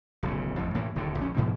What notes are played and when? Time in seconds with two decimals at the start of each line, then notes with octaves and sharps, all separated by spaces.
0.23 D1 B1 C#3
0.57 A1 F2 A2
0.75 A2 E3 A#3
0.95 D1 D#2 A2 D3
1.18 A#1 C#4
1.37 G#2 B2 F3 G#3